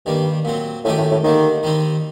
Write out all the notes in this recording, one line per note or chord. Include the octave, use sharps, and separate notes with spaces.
G2 D#3 G3 A#3
A#2 F#3 C4
F#2 A2 D#3 A3 D#4 G4
A2
A2
D3 D#3 G3 A#3
D#3 G3 C4 D#4